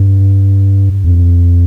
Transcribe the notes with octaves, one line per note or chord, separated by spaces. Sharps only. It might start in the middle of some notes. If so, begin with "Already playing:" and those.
Already playing: G2
F2